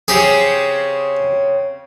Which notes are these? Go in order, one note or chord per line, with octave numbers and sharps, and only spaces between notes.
C#3 C4 G4 G#4